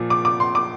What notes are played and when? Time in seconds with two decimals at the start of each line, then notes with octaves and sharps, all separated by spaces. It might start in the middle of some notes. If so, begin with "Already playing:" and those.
Already playing: A#2 F3
0.10 D6
0.25 D6
0.40 C6
0.55 D6